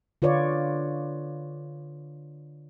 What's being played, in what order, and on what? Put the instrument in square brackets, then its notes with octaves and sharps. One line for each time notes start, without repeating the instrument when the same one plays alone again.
[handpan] D3 F4 B4 C#5 D5